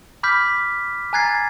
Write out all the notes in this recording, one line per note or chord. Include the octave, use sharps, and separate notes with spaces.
B5 D6 F6 G6 B6
G#5 A#5 F#6 G#6 A6 C7